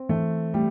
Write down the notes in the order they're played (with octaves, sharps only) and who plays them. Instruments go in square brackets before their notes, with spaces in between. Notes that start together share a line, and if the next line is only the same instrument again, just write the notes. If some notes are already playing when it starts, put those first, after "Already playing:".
Already playing: [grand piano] C4
[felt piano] E3 [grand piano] A3
[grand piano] G3 [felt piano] A3